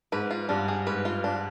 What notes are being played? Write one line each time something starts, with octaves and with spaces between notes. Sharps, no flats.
G#2 B4
F4
G2 D4
G#4
G#2 B4
F4
D4